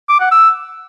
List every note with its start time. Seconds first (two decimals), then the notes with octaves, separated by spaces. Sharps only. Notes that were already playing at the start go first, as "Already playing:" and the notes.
0.09 D6
0.20 F#5
0.31 E6